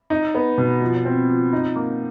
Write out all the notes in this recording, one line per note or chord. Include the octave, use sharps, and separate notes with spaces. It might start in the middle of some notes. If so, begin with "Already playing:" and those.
D#4
B3
B2
F3
C4
F3
D#4
A#3